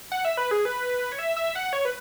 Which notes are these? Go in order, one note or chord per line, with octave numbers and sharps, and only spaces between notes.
F#5
E5
B4
G#4
B4
C#5
E5
E5
F#5
C#5
B4